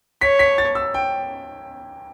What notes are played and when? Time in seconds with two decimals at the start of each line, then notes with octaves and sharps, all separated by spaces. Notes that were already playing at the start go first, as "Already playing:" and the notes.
0.21 C#5 B6
0.39 B6
0.58 A6
0.75 E6
0.94 G5